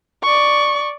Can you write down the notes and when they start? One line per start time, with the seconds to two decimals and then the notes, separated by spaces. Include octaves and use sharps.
0.23 D5 C#6